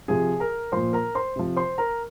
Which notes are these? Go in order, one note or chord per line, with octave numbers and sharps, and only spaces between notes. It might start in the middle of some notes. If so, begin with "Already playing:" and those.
C3 F3 G#4 G#5
A#4 A#5
A#2 F3 C5 C6
A#4 A#5
C5 C6
C3 F3
C5 C6
A#4 A#5